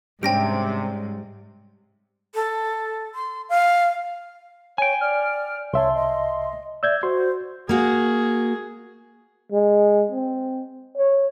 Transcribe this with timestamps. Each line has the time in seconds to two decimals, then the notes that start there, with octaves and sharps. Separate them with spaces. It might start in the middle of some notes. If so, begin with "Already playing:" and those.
0.23 G#2 C3 G3 C#4 D4 G5 A#6 D7
2.35 A4
3.15 C6
3.49 F5
4.78 C#5 G5 G#5
5.01 D5 F6
5.73 C2 C#5 E5 A5 C6
5.95 D#5
6.83 D5 E5 E6 G6 G#6
7.03 F#4 C5 C6
7.69 A#3 F#4 G#4
9.52 G#3
10.12 C4
10.97 C#5